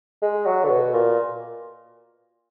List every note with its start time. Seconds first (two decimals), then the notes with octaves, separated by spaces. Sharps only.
0.22 G#3
0.46 F#3
0.64 D3
0.69 B2
0.94 A#2